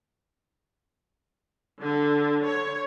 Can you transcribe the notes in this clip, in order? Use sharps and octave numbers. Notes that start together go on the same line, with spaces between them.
D3
C#5